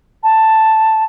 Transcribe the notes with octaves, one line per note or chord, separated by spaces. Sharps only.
A5